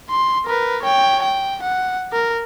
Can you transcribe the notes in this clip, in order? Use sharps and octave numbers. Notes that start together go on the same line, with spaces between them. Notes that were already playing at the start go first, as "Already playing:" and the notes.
C6
A#4 B4
C#5 G5
G5
F#5
A#4